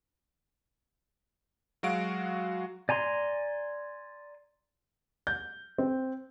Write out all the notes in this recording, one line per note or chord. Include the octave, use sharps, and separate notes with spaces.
F#3 G#3 F#4 F5 D7
D5 G#5 A#5 C6
G6
C4